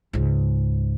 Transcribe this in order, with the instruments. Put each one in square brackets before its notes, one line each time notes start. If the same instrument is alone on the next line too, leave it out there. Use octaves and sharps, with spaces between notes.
[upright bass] C#2 G#2